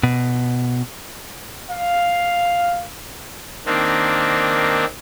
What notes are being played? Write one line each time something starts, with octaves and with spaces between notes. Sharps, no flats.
B2
F5
D#3 A#3 C4 D4